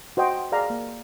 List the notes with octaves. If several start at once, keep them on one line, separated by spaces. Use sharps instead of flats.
F#4 C5 D#5 G5
G#4 D5 F5 A#5
A#3